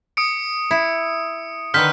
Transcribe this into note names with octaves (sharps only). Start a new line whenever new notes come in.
D#6 C#7 D7
E4
D3 D#3 B4 F6 G6 B6